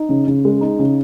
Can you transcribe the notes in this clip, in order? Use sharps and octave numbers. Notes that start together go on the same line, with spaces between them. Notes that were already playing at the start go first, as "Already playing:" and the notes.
Already playing: D#4
C#3
C#3
G#3
D#4
C#3